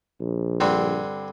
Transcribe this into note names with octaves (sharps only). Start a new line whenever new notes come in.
A#1
G2 D3 C4